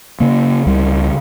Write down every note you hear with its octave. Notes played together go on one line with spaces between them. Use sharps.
C#3 A#3
C#2 G3